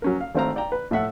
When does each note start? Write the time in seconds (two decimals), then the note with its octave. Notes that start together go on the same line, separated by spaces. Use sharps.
0.02 F#3 C#4 A#4
0.21 F5
0.35 G#1 A3 C4 F5 A#5
0.56 D5 G5 A#5
0.72 B4
0.91 A2 A3 E5 F#5